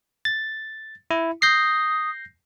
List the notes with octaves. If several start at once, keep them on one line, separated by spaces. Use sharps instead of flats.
A6
E4
D#6 G6 A#6 C7